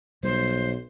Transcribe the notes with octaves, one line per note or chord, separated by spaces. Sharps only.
B1 G3 C5